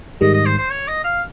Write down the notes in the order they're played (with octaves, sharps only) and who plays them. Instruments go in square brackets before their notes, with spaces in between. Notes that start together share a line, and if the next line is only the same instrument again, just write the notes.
[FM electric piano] G#2 D#3 G3 [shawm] D#5
[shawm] D#5
C5
C5
C#5
D#5
F5